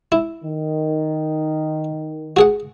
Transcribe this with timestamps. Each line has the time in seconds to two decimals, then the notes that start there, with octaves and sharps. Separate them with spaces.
0.12 E4
0.44 D#3
2.36 F#4 G#4 F#5